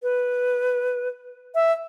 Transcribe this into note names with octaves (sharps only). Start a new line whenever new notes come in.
B4
E5